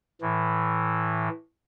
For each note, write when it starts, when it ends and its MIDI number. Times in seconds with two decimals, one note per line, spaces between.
0.21 1.29 45
0.21 1.29 52